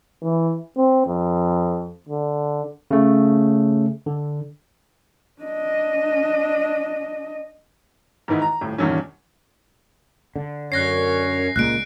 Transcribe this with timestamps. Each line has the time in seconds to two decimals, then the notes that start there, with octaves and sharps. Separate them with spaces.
0.23 E3
0.77 C4
1.07 F2
2.09 D3
2.91 C#3 A3
4.06 D3
5.42 D4 D#5
8.28 G#2 D#3 E3 B3 D#4 E4
8.42 A#5
8.61 D#1 A2
8.78 E2 G2 A#2 D#3 C#4
10.36 D3
10.72 F#2 C#4 C#5 F#6 A#6 C7
11.56 C#2 A#2 G#3 F#6 D7